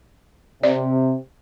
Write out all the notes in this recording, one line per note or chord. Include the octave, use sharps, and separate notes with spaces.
C3 D5